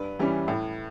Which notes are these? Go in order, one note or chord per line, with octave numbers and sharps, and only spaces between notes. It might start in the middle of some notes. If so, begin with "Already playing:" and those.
Already playing: G2 B4
E3 G3 C#4
A2